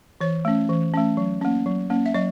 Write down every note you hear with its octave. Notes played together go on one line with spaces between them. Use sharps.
E3 C#5
A3 C#4
E3
A3 C#4
F#3
A#3 C#4
F#3
A#3 C#4
E5
F#3 D#5